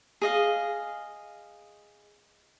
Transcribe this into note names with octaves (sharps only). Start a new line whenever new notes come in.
G#4 D#5 F5